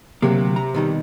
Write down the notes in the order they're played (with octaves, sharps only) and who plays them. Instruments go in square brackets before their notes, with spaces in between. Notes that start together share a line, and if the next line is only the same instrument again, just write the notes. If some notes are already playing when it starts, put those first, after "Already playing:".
[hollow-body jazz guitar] D2 F#3 A#3 [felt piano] C3
[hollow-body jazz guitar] A#5
B2 D#3 G3